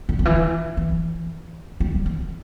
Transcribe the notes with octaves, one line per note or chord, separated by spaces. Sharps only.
D3
D3
E3
E3
G3
E3